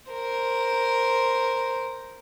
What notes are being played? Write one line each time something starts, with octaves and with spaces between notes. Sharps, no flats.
A#4 C5